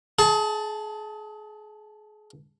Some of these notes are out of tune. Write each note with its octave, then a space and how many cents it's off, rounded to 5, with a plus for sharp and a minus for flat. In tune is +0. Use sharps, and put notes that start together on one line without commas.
G#4 +30 A5 +0